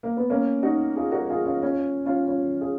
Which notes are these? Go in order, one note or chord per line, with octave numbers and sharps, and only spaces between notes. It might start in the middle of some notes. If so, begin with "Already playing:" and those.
A#3
B3
A#3 C#4
D#4 F#4
F4 G#4
F#4 A#4
F4 G#4
C#4 F4
C#4 F4
C#4 F4
C#4 F4
F4 G#4